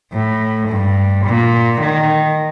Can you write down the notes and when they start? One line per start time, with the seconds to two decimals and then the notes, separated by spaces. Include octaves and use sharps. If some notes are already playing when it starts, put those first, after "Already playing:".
0.12 A2
0.69 G2
1.25 A#2
1.80 D#3